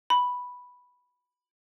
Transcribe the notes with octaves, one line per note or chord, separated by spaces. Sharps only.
B5